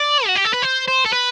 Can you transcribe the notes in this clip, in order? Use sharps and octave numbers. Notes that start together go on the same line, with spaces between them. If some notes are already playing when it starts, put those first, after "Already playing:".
Already playing: D5
F#4
G4
A4
B4
C5
C5
A4
B4